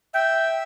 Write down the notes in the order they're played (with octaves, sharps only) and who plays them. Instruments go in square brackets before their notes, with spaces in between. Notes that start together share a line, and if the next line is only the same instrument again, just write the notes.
[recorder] E5 [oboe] G5